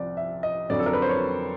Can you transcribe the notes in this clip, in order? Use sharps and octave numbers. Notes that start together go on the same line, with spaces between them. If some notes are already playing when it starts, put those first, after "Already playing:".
Already playing: C2 C3 F3 D5
E5
D#5
F2 D3 F#3 D5
A4
A#4
B4
C5
C#5